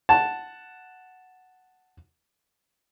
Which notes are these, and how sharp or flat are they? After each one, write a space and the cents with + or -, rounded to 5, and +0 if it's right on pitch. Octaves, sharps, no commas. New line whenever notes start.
F#5 +0 A5 +0